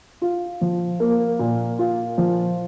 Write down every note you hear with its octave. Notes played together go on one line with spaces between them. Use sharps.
F4
F3
A#3
A#2
F4
F3